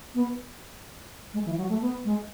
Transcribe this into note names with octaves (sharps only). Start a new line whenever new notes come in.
B3
G#3
E3
F#3
A3
B3
G#3